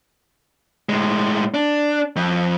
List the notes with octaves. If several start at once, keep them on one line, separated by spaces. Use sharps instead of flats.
A2 G#3
D4
F2